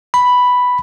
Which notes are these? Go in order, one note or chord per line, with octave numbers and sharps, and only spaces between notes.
B5